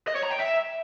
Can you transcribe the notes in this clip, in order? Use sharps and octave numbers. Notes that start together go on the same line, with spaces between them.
D#5
C#5
A#5
G5
E5